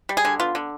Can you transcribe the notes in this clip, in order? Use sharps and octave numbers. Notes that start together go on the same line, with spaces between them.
G3
G#4
D3
B3 F4
D3